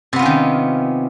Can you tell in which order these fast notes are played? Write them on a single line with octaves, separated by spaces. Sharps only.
C3 B3 F4 C#4 D#3